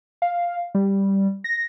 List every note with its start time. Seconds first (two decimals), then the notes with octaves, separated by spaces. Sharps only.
0.22 F5
0.75 G3
1.44 A#6